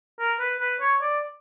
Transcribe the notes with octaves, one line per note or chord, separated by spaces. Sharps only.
A#4
B4
B4
C#5
D5